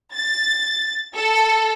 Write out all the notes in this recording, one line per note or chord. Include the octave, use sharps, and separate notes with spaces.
A6
A4